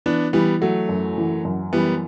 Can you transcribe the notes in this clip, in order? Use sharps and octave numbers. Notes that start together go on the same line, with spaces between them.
E3 B3 D4
E3 G3 B3
F#3 A3 F#4
F#2
E3
F#2
E3 G3 B3